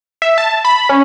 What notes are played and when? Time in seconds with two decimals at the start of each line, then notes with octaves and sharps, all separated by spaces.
0.22 E5
0.38 A5
0.65 B5
0.89 C#4